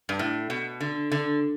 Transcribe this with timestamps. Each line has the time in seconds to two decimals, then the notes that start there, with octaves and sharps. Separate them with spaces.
0.09 G2
0.19 A2
0.50 B2
0.81 D3
1.12 D3